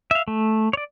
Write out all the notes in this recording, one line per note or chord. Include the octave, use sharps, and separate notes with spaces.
E5 F5
A3
C#5 D5